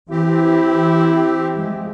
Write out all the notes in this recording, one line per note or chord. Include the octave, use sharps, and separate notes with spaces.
E3 C4 E4 G4
F3 G#3